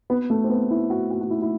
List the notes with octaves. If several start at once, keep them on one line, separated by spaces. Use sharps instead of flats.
B3
A3
C4
B3
E4
F#4
F#4
F#4
E4
E4